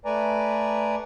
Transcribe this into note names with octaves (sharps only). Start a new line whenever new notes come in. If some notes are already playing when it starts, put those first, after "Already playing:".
A3 B4 D5 G#5 A#5